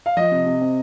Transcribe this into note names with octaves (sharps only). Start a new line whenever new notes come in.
F5
F3 D#5
C3
C3
C4